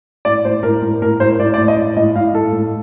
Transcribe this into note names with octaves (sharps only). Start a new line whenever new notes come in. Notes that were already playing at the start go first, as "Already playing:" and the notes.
A2 D5
A2 C5
A2 A#4
A2 A#4
A2 A#4
A2 C5
A2 D5
D5
A2
D#5
A2
A2 D#5
A2 F5
A2 A4
A2